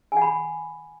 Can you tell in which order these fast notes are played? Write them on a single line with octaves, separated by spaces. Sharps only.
G#5 F#5 B5